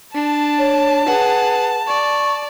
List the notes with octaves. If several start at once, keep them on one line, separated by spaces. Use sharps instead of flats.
D4 A5
C#5
G#4 B4 F#5
D5 C#6